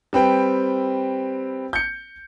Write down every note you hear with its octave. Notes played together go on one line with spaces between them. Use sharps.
G3 C4 B4 G5
G6 C#7